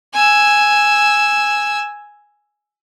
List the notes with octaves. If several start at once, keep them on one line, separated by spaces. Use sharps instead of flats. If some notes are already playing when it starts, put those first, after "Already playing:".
G#5 E6